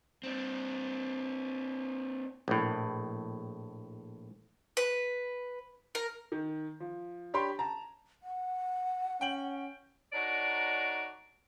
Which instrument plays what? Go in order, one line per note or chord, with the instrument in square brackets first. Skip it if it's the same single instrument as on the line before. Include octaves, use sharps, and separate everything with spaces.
[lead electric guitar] C4 D4
[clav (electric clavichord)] A#1 A2
[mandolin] B4
A#4
[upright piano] D#3
F3
D4 G4 C#5 G5 B5 C6
A5 A#5
[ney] F#5
[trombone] C#4 [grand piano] G5 F#7
[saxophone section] D4 D#4 F#4 A#4 C#5 D5